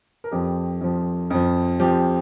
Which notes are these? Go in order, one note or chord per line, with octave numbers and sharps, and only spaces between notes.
A#4
F2 F3 G4
F2 F3
F2 F3
F2 F3 G4